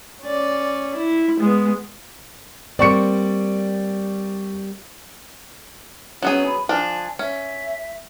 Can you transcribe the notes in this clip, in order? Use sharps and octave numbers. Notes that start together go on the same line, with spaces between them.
C#4 D5
E4
G#3 B3
G3 A#3 C4 D5 C#6 C#7
F#3 B3 C#4 G#4
B5
F3 D4 G#5
C#4 E5